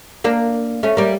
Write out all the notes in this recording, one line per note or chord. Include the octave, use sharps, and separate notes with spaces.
A#3 D4
A3 C#4
G3 A#3